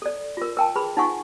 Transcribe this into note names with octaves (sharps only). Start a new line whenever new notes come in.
A4 D5
F4 A#4
A#4 G5 A5
G#4 B4 B5 C6
D#4 F4 F#5 G#5 C#6